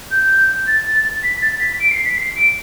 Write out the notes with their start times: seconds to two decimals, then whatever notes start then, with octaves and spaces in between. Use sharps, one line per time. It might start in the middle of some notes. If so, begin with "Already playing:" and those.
0.11 G6
0.67 A6
1.23 B6
1.41 A6
1.60 B6
1.79 D7
1.91 C7
2.04 B6
2.17 C7
2.35 D7